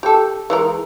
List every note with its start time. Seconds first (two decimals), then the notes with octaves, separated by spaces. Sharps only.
0.03 G4 A4
0.50 E3 G#3 A#4